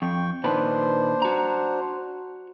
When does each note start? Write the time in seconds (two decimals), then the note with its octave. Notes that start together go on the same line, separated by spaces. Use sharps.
0.02 F2 G5 C#6
0.44 A#2 D#3 D4 B4 C5
1.22 F#4 A#5